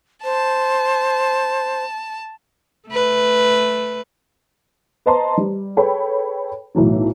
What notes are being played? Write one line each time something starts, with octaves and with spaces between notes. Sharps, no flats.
C5 A5
A3 B4
B4 C5 D#5 A5 A#5 C6
G3
G#4 A4 B4 C#5 G5 B5
B1 A2 E3 F#3 A3